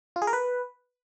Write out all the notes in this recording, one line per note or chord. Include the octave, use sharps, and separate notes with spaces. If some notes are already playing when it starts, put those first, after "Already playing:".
F4
G#4
A#4
B4